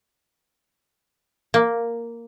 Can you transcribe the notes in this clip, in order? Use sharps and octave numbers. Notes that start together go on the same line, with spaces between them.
A#3